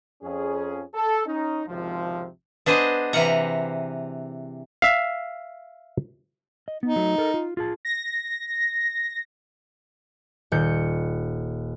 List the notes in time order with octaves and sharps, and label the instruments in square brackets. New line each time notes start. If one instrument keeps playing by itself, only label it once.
[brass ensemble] F2 C#4 G#4
A4
C#4 D#4
G#1 C#2 C3 F3
[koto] B3 D4 G#4 C5 D#5
C3 E3 F5 F#5 A#5
[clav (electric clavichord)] E5 F5
[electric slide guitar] D#5
[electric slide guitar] B3 [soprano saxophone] D#4
[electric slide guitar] F#3 A3
A4 A#4
F4
F4 G#4 A5
[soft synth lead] A#6
[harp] D#1 G6 C#7